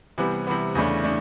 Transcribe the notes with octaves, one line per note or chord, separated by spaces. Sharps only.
C3 E3 G3 B3
C3 E3 G3 B3
E2 C#3 E3 A3 D4
A3 D4